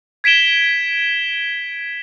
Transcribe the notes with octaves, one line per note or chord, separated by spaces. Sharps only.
G#6 B6 D7 E7 G7